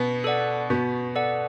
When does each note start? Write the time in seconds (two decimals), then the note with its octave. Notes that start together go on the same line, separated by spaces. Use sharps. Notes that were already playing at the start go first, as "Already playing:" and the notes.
Already playing: B2 B3
0.24 A4 D5 F#5
0.70 B2 B3 F#4
1.15 A4 D5 F#5